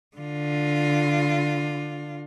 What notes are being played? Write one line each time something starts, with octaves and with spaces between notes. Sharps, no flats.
D3 F4